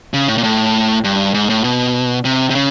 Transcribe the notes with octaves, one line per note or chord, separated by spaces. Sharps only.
C#3
A2
A#2
A2
G2
G#2
A2
B2
C3
C3
C#3